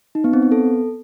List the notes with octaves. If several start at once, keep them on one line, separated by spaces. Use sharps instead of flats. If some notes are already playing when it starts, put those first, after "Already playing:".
D#4
B3
C4
B3
A4